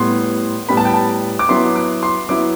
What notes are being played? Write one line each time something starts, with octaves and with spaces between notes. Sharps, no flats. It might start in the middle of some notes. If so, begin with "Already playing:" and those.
Already playing: A2 G3 B3 C6
A2 G3 B3 B5
A5
G5
A5
D6
F#3 B3 E4 C6
D6
C6
F#3 B3 E4 D6